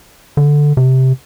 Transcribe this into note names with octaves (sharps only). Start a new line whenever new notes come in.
D3
C3